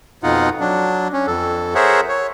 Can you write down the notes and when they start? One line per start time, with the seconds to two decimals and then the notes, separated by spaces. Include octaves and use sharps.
0.23 F2 B2 D#4 F4 F#5
0.60 F#3 D4
1.13 C#4
1.27 F2 A4
1.75 G#4 A#4 C5 C#5 E5 F#5
2.09 C#5